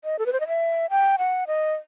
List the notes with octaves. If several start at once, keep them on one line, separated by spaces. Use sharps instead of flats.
D#5
A4
B4
C5
D#5
E5
G5
F#5
D#5